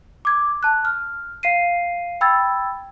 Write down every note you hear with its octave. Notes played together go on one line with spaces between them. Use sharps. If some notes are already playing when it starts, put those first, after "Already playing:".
D6 G#6
A5 F#6
F6
F5 C7 D#7
G5 B5 E6 G#6 A6